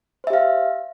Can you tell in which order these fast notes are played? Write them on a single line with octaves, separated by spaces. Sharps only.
C5 E5 G4 F5